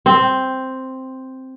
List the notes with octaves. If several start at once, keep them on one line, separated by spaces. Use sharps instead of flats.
C4